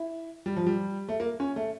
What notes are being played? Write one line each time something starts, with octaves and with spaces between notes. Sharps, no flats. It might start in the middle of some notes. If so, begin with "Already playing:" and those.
Already playing: E4
G3
F3
G3
A3
A#3
C#4
A3